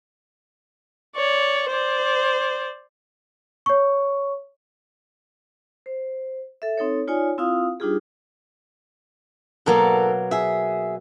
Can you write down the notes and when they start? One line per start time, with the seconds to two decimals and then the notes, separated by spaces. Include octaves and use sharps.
1.16 C#5 D5
1.70 C5 D5
3.66 C#5 C#6
5.86 C5
6.62 A4 E5
6.78 C4 D#4 A4 C#5
7.07 D#4 F4 C#5 D5 G#5
7.38 C4 E4 F4 F5 D#6
7.80 G3 D4 D#4 F4 G4 G#4
9.66 G#2 B2 F#3 A#3 A4 A#4
10.31 G#4 E5